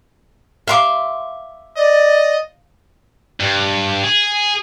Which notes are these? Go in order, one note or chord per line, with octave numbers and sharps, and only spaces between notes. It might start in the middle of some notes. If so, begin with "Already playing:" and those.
E5 F5 C6 D6
D5 D#5
G2
G#4